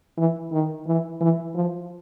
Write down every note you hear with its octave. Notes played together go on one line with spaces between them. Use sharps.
E3
D#3
E3
E3
F3